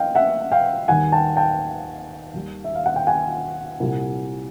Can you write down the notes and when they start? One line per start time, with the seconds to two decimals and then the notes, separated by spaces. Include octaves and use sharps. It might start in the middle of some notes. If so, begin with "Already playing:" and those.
Already playing: E3 D#5 F5 G5
0.15 E5 F#5
0.52 F5 G5
0.88 D#2 D#3 G3 F#5 G#5
1.12 G5 A5
1.37 G5 A5
2.33 D#2 D#3 G3
2.64 E5
2.75 F5
2.86 F#5
2.96 G5
3.07 F#5 G#5
3.80 C2 A#2 G3